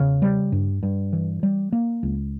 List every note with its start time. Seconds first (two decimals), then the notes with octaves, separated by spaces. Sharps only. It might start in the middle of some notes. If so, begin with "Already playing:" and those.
Already playing: E2 C#3
0.22 G3
0.52 G2
0.83 G2
1.13 E3
1.43 G3
1.72 A#3
2.03 C#2